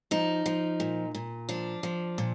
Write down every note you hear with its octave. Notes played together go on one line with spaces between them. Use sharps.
F3 D#4
F3
A#2
A#2
F3 D4
F3
A#2